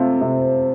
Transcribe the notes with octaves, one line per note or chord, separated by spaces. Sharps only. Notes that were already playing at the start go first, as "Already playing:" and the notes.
Already playing: C3 A3 C4 F4 A4
C3